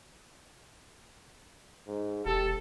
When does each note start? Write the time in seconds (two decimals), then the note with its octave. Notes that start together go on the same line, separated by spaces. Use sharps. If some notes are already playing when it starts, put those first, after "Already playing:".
1.87 G#2
2.26 E1 G4 A4